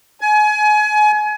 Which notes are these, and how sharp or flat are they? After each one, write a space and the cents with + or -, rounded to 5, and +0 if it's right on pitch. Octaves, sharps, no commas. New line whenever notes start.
G#5 +30